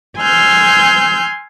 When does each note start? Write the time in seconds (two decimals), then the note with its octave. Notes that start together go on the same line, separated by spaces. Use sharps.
0.19 G#5 C6 E6 F6 G6